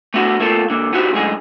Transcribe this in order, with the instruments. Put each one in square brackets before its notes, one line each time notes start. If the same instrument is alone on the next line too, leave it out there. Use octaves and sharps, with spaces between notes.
[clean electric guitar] A3 B3 D4 E4 F#4
A3 A#3 C4 F4 A4
D3 A#3
B3 D#4 E4 F#4 G4 C5
F#2 A2 D3 G#3 G#4